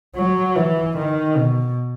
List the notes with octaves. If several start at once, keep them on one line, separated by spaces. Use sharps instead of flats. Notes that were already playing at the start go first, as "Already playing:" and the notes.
F#3
E3
D#3
B2